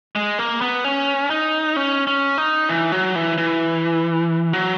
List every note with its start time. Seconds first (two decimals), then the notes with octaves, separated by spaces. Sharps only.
0.16 G#3
0.39 A#3
0.61 B3
0.84 C#4
1.31 D#4
1.76 C#4
2.07 C#4
2.38 D#4
2.69 E3
2.92 F#3
3.15 E3
3.38 E3
4.53 F#3